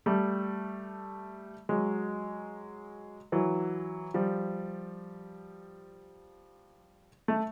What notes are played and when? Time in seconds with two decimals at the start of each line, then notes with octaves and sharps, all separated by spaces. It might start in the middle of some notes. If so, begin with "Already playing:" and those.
0.06 G3 A3
1.69 F#3 G#3
3.32 E3 F#3
4.14 F3 G3
7.28 A3